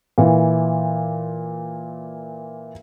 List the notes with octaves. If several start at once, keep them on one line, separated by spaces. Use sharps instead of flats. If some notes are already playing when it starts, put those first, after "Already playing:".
A#2 E3